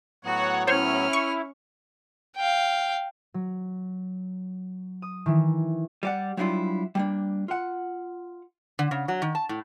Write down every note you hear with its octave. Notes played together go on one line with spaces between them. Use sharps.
A2 F#3 B3 F#4 C#5 F#5
C#4 E4 C5 C#5 F6
C#6
F5 G5
F#3
D#6
D#3 E3
G3 D5 F#5
F#3 G3 D4 E4 F4
G3 A#3 D4
F4 F#5
D3
C#3
F#3
D#3
A5
A2